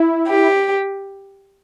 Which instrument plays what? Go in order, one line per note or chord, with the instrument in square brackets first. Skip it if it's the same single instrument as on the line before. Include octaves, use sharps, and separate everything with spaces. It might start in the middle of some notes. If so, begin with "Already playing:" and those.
Already playing: [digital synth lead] E4
[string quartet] G4